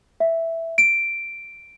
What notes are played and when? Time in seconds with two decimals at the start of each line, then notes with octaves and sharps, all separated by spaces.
0.20 E5
0.78 D7